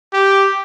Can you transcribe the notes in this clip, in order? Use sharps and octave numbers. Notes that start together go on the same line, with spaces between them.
G4